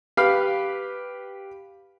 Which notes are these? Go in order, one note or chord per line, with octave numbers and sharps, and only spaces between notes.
G4 B4 F5 B5